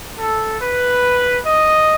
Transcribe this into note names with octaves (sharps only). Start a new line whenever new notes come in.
A4
B4
D#5